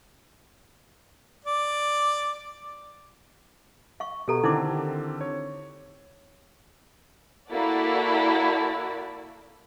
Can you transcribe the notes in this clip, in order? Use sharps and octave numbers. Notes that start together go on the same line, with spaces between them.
D5
F5 C#6
B2 G4 A4 A#5
D3 D#3 C4 D#4 E4 D6
C#5
A#3 E4 F#4 A4 D5